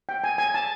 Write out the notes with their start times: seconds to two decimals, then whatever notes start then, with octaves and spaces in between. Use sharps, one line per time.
0.09 G5
0.24 G#5
0.38 G#5
0.54 A5